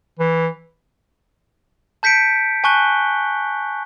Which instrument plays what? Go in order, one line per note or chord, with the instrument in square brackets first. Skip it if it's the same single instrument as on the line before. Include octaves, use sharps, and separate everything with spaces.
[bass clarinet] E3
[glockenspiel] A5 G6 B6 C#7 D7
G#5 A5 C#6 F#6 G7